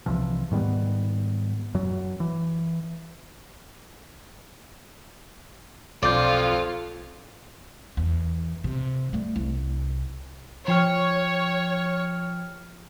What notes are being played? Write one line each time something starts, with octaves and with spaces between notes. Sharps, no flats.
C2 C3 E3 F3
G#2 D#3 G3 B3
F#2 F#3
E3
B1 F2 F4 D5 G6
E2
C3
G3 A3
C2
F3 C#5 G5 F6